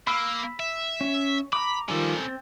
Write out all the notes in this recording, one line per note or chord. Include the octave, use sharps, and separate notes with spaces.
A#3 B5 E6
E5
C#4
A#5 B5 D6
D#3 F3 G3 C#4 A4
C4